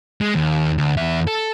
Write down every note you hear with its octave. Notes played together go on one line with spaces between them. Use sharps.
G#3
D#2
D2
E2 E5
A4